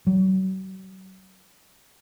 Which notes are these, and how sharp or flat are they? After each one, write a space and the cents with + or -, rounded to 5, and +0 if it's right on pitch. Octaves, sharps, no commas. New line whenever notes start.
F#3 +40